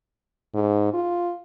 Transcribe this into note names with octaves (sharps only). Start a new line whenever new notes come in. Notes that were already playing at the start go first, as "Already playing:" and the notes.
G#2
F4